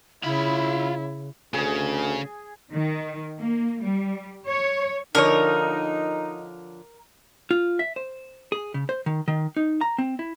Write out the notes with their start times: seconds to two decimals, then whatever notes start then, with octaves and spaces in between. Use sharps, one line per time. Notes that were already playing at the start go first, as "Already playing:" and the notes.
0.23 C#3 E4 F4 B5
1.54 D2 C#3 G#4 G#5
2.73 D#3
3.39 A#3
3.82 G3
4.47 C#5
5.15 D3 F3 D#4 A#4 C#5
7.51 F4
7.79 E5
7.96 C5
8.52 G#4
8.74 C#3
8.89 C5
9.06 D#3
9.28 D#3
9.57 D#4
9.81 A#5
9.98 C4
10.19 E4